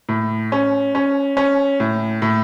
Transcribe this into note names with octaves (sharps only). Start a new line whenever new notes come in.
A2
C#4
C#4
C#4
A2
A2